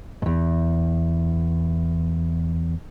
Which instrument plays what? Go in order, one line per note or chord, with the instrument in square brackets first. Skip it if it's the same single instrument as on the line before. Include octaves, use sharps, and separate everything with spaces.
[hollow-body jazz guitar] E2 G2